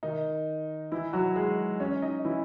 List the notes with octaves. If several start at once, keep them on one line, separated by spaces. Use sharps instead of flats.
D#3 D#4
E3 E4
F#3 F#4
G#3 G#4
C#4 C#5
D#4 D#5
E3 E4